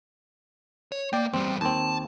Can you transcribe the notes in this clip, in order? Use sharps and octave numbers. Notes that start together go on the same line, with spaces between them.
C#5
A#3 D5 G5
E2 G3 C4
D#2 C4 A5